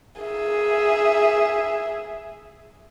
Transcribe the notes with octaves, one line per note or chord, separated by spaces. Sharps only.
G#4 E5